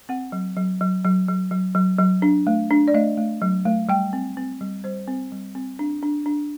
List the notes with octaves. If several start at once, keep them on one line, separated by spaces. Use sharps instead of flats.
C4 F#5
F#3
F#3
F#3
F#3
F#3
F#3
F#3
F#3
D4
A3
D4
D5
A3 D#5
A3
F#3
A3
G3 G5
C4
C4
G3
G3 C5
C4
G3
C4
D4
D4
D4